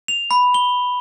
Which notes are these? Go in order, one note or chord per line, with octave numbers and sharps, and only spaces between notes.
F7
B5
G7